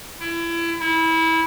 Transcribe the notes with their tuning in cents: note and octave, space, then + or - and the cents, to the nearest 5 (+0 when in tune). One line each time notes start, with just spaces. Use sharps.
E4 +30
E4 -20